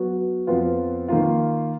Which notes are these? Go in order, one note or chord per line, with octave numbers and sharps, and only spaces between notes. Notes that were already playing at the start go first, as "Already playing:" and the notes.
Already playing: F#3 B3 F#4
F2 F3 B3 F4 B4
D#3 A#3 F4